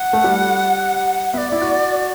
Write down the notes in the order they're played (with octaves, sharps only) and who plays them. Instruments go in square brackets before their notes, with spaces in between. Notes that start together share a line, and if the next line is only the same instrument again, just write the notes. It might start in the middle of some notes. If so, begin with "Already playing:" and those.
Already playing: [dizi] F#5
[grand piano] A3
G3
[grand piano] B3 [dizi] E5
[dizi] D5
[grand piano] E4
F#4